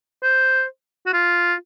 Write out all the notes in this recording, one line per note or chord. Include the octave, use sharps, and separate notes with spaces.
C5
F#4
F4